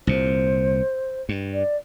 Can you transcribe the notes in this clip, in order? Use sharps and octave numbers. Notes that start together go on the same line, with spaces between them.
C2 A#2 C5
G2
D5